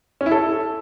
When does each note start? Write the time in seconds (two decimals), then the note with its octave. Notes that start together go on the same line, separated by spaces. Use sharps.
0.21 C#4
0.26 E4
0.31 A4